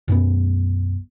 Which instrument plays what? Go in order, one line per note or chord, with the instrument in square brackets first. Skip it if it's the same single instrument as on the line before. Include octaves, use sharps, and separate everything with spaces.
[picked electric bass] B1 F#2 B2 B3